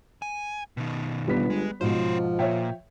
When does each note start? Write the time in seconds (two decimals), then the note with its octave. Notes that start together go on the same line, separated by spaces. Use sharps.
0.22 G#5
0.77 B2 D#3
1.27 G1 G3 B3 B6
1.50 G#3
1.81 G#2 B2 F3 C#4 C5
2.39 A#2 C#5 E5 G5